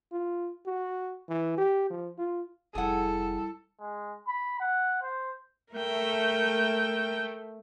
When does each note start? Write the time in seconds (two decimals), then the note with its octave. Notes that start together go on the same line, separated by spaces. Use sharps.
0.12 F4
0.66 F#4
1.29 E3
1.58 G4
1.90 F3
2.18 F4
2.75 F1 G3 E4 G#4 A4 F#5
3.80 G#3
4.27 B5
4.60 F#5
5.02 C5
5.73 A3 A#4 G5